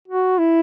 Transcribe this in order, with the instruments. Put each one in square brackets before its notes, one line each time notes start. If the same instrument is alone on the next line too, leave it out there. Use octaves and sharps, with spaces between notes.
[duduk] F#4
E4